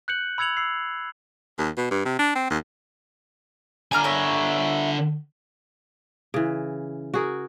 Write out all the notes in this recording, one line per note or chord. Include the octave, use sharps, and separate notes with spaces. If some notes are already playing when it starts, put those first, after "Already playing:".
F#6 G6 C#7 F#7
B5 E6 G#6 C#7 F7 F#7
E6 C7
D#2
B2
G2
C3
D4
C4
D#2
D3 D4 G#5 A#5 F6
A#4 C#5 E5
C#3 E3
F#4 G#4 A#4